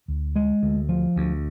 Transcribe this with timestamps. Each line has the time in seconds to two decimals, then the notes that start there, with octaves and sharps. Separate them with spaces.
0.08 D2
0.36 G#3
0.63 D2
0.89 F3
1.16 D2